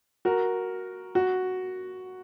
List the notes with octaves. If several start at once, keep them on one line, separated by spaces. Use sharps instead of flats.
F#4 A#4
F#4